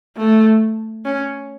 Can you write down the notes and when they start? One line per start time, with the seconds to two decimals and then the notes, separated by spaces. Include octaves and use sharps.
0.17 A3
1.05 C#4